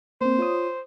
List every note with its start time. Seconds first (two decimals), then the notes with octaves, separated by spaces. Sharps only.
0.21 A#3 C4 C5
0.39 F4 C#5 D#6